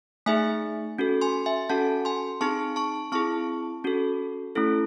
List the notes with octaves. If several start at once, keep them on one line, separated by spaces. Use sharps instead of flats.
A3 D#4 G#4 E5 G#5
C#4 F#4 A4
G#5 C6
E5 G#5
C#4 F#4 A4 F#5 A5
G#5 C6
C4 D#4 G#4 A5 C#6
A5 C#6
C4 E4 G#4 A5 C#6
C#4 F#4 A4
A3 C#4 E4 A4